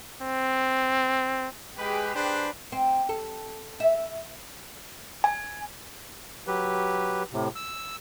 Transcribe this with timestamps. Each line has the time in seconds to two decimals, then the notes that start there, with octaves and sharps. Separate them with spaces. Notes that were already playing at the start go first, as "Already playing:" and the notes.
0.22 C4
1.78 G#3 G4 G#4 B4
2.15 D4 B4 C5
2.72 C4
3.09 A4
3.80 E5
5.24 G#5
6.47 F#3 G4 B4
7.32 A2 C3
7.56 E6